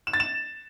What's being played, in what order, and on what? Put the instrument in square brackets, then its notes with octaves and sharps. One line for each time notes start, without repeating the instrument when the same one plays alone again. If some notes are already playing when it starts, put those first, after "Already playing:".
[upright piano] E7
A6
E7